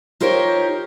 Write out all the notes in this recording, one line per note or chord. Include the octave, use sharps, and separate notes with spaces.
D#4 F4 G4 A#4 C5 C#5